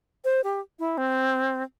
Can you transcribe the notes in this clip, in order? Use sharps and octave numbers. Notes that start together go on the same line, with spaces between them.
C5
G4
E4
C4